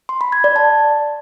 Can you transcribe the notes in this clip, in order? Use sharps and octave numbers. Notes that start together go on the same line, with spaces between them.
C6
B5
G#6
D5
A5